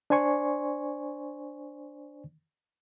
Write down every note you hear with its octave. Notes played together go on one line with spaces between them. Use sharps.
D4 C5 D5 G#5 C6 C#6